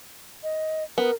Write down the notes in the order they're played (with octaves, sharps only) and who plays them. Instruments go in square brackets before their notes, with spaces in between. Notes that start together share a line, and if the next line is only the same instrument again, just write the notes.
[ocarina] D#5
[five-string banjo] B3 [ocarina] A#4